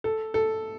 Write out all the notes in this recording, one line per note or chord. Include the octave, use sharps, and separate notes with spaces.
A4
A4